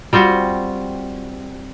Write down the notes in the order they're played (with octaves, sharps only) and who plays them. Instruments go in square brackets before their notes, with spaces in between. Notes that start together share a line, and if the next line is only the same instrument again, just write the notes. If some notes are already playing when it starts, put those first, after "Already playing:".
[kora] G3 C4 F4 F#4